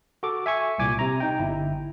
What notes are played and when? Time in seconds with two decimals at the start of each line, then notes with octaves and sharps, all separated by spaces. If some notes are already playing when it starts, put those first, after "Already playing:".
0.23 F#4 A4 D6
0.46 E5 G#5 C#6
0.78 C2 A#2 G#5 D6
0.99 C3 A#5
1.20 D#4 G5
1.39 G1 E4